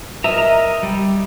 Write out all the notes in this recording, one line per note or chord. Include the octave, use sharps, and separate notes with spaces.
A#4 D#5 E5 A#5
G3